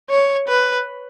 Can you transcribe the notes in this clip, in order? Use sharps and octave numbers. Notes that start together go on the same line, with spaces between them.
C#5
B4